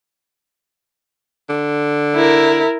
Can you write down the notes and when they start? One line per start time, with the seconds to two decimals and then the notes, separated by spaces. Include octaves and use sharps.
1.50 D3
2.15 E4 A#4